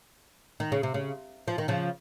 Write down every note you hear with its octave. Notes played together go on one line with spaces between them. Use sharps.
D#3
C#3
C3
C#3
F3
D#3
C#3 F3